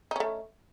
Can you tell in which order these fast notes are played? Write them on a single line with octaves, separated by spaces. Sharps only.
D#4 C#4 A3